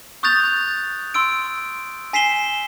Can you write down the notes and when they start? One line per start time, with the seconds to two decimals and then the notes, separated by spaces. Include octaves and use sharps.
0.23 C#6 D#6 F#6 G6 A6 F7
1.14 C6 E6 D7
2.13 G#5 B6 C7 E7 G7